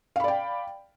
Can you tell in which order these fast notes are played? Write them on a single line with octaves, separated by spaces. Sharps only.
F5 B5 D5 G5